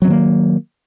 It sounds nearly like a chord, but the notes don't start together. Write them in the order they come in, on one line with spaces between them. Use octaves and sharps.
F#3 C4 D#3 A#3